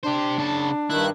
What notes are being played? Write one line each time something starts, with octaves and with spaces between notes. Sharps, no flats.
D4 G4 C5
C#3 A5
G2 D#3 E4 F#6